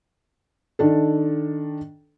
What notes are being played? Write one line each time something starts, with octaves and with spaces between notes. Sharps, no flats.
D#3 D4 A4